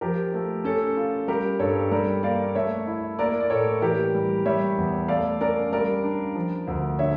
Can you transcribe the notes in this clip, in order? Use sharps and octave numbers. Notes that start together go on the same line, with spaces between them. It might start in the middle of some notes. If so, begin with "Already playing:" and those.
F3 G4 A#4
A3
C#4 A4
F4
G3 G4 A#4
G2 A4 C#5
G3 A#4 D5
A#3 D5 F5
A3 C#5 E5
E4
A#3 A#4 D5
D5
A2 A4 C#5
E3 G4 A#4
G3
G3 C#5 E5
E2
A3 D5 F5
C#4 A#4 D5
G3 A#4 D5
D4
F3
D2
D3 C#5 E5